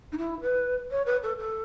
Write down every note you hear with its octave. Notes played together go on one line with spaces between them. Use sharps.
D#4
E4
B4
C#5
B4
A4
A4